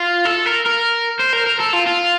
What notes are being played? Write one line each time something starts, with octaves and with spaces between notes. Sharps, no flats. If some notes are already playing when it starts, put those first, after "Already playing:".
Already playing: F4
A4
A#4
A#4
C5
A#4
A#4
A4
F4
F4